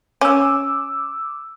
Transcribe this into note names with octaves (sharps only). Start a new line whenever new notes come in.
C#4 D6 E6